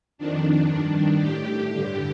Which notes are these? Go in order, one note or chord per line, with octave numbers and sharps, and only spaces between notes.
F2 D#3 D4
G2 D#3
A2 G4
G2 D3